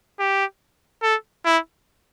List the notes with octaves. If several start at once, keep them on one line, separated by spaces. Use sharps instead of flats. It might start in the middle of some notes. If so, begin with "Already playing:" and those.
G4
A4
E4